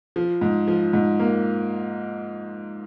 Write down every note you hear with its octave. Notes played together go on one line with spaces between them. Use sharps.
F3
G#2
F3
G#2
A#3